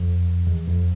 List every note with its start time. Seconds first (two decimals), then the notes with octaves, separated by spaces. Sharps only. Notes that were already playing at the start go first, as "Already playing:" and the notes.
Already playing: F2
0.47 E2
0.68 F2